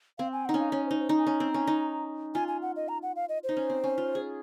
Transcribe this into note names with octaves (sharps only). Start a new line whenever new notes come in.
C4 F5
G#5
D#4 F#5
C#4
F5
C#4 C#5
C5
D#4
C5
D#4
G#5
C#4 A#5
C4
C#4
D#4
F4 G#5
G#5
F#5
D#5
A#5
F#5
F5
D#5
D#4 C5
C#4
C4
C#4
F4
G#4